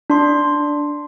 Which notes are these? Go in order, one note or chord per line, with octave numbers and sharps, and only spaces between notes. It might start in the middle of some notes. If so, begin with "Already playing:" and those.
D4 C6